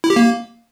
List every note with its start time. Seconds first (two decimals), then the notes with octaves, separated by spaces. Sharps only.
0.04 E4
0.10 G4
0.16 A#3